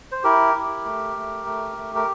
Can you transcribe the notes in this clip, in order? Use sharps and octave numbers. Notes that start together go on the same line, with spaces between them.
C5
E4 G4 A#4
E4
A3
A3
A3
A3
A#4